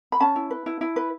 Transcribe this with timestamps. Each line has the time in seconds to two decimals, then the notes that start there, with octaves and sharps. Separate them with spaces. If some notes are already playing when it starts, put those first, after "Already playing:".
0.12 B5
0.20 C#4 A5
0.36 E4
0.51 B4
0.66 E4
0.81 E4
0.96 B4